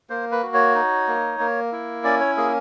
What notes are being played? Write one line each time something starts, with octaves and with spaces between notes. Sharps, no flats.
A#3 C5
B4
F#4
C#5
D#4
A#3
A#3
E4
C#4 D5
C#5
A#3 G#4